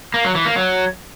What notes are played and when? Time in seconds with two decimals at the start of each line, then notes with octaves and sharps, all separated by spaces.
0.14 A#3
0.24 F#3
0.35 E3
0.45 A#3
0.56 F#3